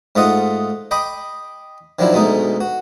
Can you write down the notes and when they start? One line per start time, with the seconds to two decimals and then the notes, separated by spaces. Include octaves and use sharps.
0.15 G#2 A3 F4 D#5 F#5 D#6
0.91 D#5 G5 B5 D6 D#6
1.99 D#3 F3 F#3 D4 E4
2.13 D2 B2 G#3 A3 D#4
2.61 F#4